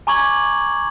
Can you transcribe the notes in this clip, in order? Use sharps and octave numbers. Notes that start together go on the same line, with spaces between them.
G#5 A#5 C#6 D6 G#6 F#7